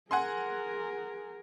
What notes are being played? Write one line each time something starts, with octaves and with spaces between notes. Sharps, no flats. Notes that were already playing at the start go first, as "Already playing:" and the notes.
G#4 A#4 F#5 G#5 C6